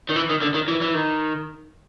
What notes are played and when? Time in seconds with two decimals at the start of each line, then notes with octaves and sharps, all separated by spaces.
0.09 D#3
0.16 E3
0.30 D#3
0.42 D3
0.54 D#3
0.68 E3
0.81 E3
0.94 D#3